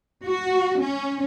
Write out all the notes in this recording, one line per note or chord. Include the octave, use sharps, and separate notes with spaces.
F#4
C#4